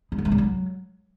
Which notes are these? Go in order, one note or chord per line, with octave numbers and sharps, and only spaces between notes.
G#3
B3
A3
G3
F#3